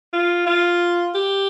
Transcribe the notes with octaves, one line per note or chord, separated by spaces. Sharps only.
F4
F4
G4